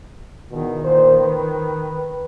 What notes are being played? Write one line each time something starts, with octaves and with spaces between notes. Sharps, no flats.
E2 B2 D#3
A#2 C5
B4